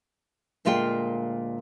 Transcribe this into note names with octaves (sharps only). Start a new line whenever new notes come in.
D2 A#2 G#3 F4 G5